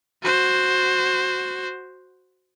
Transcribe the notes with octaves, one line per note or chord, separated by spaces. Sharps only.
F#4 C5